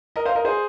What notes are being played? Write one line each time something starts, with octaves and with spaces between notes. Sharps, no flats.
A#4 D#5
C5 F5
A#4 D#5
G#4 C5